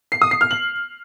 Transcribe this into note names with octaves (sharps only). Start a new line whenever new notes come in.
C7
D#6
C7
F6
F#7